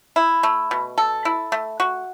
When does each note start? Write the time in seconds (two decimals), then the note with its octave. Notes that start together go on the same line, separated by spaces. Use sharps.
0.16 E4
0.43 A3
0.71 B2
0.98 A4
1.25 E4
1.52 A3
1.80 F#4